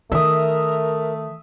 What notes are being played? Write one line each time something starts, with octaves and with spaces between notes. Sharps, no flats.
D#3 A3 A#4 E5 D#6